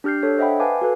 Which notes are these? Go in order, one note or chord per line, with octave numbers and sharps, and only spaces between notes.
D4 G4 F6 G6 C7
D4 A4 C#5
C5 D#5 E5 F#5 G5 B5
B4 F5 G#5 A5 D6
F#4 A4 B4